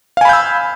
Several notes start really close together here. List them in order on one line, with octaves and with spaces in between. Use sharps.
F5 G#5 B5 G6 E6